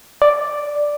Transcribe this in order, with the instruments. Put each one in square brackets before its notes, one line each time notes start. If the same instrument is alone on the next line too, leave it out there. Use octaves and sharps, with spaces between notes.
[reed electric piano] D5